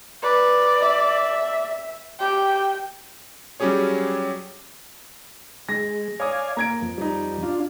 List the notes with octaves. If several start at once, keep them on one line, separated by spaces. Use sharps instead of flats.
B4 D5
E5
G4 G5
F#3 G3 C#4 G4 G#4 C#5
G#3 A#6
C#5 D5 F5 G#5 D#6
A#3 A#5 G#6 D7
F2
G3 D#4
D4 F4